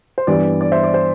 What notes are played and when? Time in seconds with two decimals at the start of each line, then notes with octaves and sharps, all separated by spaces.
0.18 C5
0.27 G2 E3 G3 B3 D5
0.61 D5
0.72 C5 E5
0.83 D5
0.94 C5